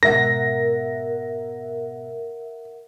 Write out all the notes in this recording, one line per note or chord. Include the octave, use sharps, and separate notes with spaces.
G#2 B2 A#4 E5 F#5 A#6